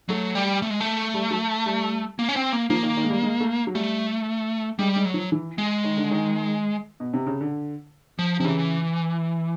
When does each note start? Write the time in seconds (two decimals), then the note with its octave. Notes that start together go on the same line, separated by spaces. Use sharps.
0.09 F#3 A3
0.35 G3
0.62 A3
0.70 G#3
0.81 A3
1.14 G3
1.31 F#3
1.66 G3
2.19 A#3
2.29 C#4
2.36 C4
2.52 A#3
2.70 F3 A#3
2.83 D#3
2.97 D#3
3.04 G#3
3.10 G3
3.23 G#3
3.40 A3
3.67 F#3
3.74 G3 A3
4.79 G3 G#3
4.96 G#3
5.05 F#3
5.14 F3
5.32 E3
5.58 G#3
5.84 D#3
5.97 D3
6.11 D#3
7.00 B2
7.13 C3
7.26 C#3
7.41 D3
8.19 F3
8.39 C3 F3
8.44 C#3 E3